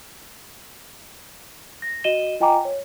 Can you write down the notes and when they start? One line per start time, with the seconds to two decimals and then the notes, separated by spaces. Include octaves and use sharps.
1.82 A#6
2.04 F#4 D#5 D#7 E7 G7
2.40 F4 D#5 G5 G#5 A#5 D6
2.65 C#5